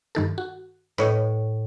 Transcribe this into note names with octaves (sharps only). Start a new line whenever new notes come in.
G2 D#3 A4
F#4
A2 B4 C#5 D#5